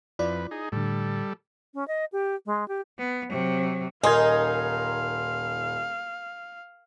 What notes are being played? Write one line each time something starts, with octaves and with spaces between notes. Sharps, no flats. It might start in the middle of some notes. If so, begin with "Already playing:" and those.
F2 E4 F4 B4 D5
D#4 G#4
A2 D3 G3 A4
C#4
D#5
G4
G#3
G4
B3
C3 F#3
D#1 D#4 A#4 F5 G#5 C6 G#6